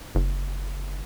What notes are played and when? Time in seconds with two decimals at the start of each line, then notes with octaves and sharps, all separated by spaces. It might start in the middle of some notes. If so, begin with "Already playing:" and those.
0.15 F#1